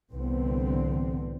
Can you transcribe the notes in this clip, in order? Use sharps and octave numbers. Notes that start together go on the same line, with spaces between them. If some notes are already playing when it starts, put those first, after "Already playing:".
C2 A2 D3 E3 B3 C4